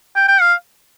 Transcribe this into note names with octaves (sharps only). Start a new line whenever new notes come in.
G5
G5
F5